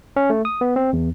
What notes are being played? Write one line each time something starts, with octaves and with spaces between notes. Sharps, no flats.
C#4
A3
D#6
B3
C4
E2